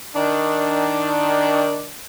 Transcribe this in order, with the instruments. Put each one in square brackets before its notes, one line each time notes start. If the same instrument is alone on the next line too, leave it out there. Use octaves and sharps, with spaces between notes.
[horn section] D#3 D4